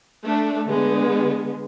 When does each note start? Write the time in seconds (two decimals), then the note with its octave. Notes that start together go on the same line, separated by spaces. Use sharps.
0.24 A3 D4
0.69 D3 G#3 B3